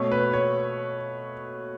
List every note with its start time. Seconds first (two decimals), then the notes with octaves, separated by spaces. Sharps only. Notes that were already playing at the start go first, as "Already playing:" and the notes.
Already playing: B2 A3 C#5
0.11 B4
0.33 C#5